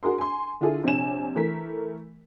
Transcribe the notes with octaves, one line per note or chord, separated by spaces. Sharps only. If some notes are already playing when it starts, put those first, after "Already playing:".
D4 F#4 G#4 A#4 C6
G#5 C6
D3 D4 E4 F4 G#4 A4
A#1 C3 D4 C#5 G#5 E7
E3 A3 A#4 B6